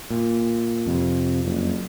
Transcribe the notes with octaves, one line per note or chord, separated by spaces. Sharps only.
A#2
F2 C3
F#1